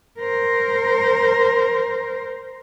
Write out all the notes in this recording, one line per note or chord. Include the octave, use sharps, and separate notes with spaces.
A#4 C5